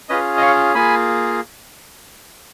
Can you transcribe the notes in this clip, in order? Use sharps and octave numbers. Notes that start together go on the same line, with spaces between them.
C#4 F4 G#4 B4 D#5
D#5
C#5 F5
A#3 F4 G#4 G#5 B5